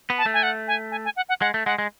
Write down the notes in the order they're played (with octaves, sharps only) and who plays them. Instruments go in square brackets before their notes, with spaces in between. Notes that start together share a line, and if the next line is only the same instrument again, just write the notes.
[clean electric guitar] B3
[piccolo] A5
[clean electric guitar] A3
[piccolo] G#5
F#5
G#5
G#5
G#5
F#5
F#5
[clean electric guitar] G#3 [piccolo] F#5
[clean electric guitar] A3
[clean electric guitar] G#3 [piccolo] F#5
[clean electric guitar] G#3